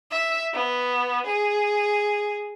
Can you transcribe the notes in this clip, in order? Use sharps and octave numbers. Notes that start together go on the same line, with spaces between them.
E5
B3
G#4